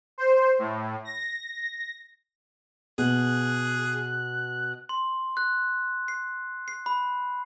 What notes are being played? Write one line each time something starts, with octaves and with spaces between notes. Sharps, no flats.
C5
A2
A#6
B2 G#4 F#6
C6
F#6
C7
C7
B5